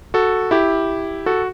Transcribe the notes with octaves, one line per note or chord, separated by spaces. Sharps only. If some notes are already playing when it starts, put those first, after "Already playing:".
F#4 A4
E4 G4
F#4 A4